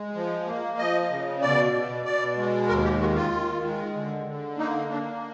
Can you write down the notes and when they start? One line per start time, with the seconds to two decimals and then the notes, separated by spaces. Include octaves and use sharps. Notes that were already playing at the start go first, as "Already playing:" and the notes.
Already playing: G#3
0.15 F3
0.46 A#3
0.78 F3 D#5
1.10 C#3
1.41 B2 D5
1.73 B2
2.05 B2 D5
2.37 G#3
2.69 D#2 A#4
2.84 G4
3.00 D#3 F#4
3.15 F4
3.32 D#3
3.63 G#3
3.95 D3
4.26 D3
4.57 A#3 D#4
4.89 A#3 D4